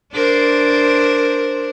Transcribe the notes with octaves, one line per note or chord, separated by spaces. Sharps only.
D4 A#4 C5